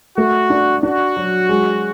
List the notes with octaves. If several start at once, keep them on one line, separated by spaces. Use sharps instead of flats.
A3 F#4
D4
D4 F#4
F#3
G#3